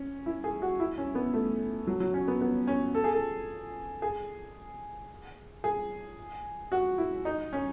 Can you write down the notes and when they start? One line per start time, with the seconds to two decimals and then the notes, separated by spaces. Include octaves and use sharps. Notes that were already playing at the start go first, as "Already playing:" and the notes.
Already playing: C#4
0.26 E4
0.44 G#4
0.62 F#4
0.80 E4
0.98 C#4
1.15 B3
1.33 A3
1.87 F#3
2.00 F#3
2.14 C#4
2.28 B3
2.41 B3
2.67 C#4
2.95 A4
3.04 G#4
3.14 A4
4.02 G#4
5.64 G#4
6.72 F#4
6.98 E4
7.25 D#4
7.53 C#4